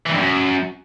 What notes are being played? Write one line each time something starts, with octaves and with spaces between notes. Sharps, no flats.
E3
G2
F#2